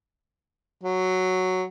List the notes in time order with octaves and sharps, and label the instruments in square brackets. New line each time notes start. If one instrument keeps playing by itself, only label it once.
[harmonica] F#3